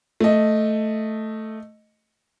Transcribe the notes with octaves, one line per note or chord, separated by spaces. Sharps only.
A3 D#5